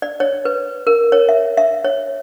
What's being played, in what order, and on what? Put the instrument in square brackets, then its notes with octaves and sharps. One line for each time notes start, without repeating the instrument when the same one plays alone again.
[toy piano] D5
C#5
B4
A#4
C#5
E5
E5
C#5